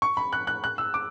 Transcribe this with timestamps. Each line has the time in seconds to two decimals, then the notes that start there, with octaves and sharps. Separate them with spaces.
0.02 C#6
0.17 B5
0.33 F#6
0.47 F#6
0.64 F#6
0.78 E6
0.94 D6